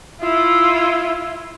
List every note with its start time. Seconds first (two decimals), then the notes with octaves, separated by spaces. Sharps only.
0.21 E4 F4